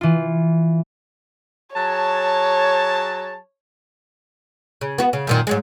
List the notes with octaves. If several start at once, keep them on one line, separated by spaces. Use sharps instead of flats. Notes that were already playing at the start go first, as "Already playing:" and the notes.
E3 F4
F#3 G#4 C#5 A5
C#3
B3 F#4
C#3
F#2 A#2 D#3
G#2 F#3 G#3